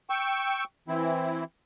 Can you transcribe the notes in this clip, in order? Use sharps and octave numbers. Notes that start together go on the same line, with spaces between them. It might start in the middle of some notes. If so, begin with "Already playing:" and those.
G5 C#6 E6
E3 C4 E4